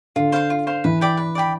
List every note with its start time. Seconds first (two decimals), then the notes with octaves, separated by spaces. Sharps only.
0.16 D3 F4
0.32 C5 F5 C6
0.50 F4
0.67 C5 F5 C6
0.84 E3 B4
1.01 D5 G5 B5
1.17 B4
1.35 D5 G5 B5